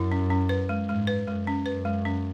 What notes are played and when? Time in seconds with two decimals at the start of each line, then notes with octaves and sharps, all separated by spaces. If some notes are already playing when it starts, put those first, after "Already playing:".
Already playing: F#2 E4
0.12 C#4
0.30 C#4
0.49 B4
0.69 G#3
0.89 G#2 G#3
1.07 B4
1.27 F#2 G#3
1.47 C#4
1.66 F#2 B4
1.85 G#3
2.05 C#4